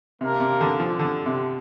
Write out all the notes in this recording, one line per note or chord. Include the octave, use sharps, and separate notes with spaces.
C3 A#3 D4 A#4 F5
C3
D3
F3
D3
C3